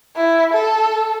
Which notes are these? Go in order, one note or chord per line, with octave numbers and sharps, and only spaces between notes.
E4
A4